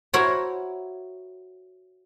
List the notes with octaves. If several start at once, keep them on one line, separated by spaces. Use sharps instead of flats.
E4 F#4 A#4 C5 C#5